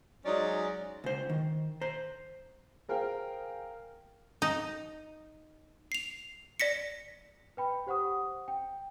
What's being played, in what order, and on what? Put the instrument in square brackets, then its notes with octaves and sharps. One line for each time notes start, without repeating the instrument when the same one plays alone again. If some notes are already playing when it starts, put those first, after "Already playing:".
[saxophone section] F#3 G#3 C#4 D#4 D5
[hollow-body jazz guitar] C#2 C5
D#3
C5 A#5
[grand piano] G#4 A#4 C5 F5 G5
[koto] D#4
[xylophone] C7 F7
D5 A#6 B6 C#7
[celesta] B4 G5 B5
G4 C5 F#5 C#6 D#6
G5